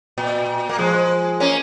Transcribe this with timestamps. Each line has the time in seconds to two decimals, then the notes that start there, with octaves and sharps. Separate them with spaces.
0.18 A#2
0.69 A#3
0.78 F3 G#3
1.40 A#3 C#4